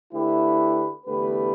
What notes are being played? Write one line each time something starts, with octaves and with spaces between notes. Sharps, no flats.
D3 A3 E4 G4 B4
E2 D3 A3 G4 B4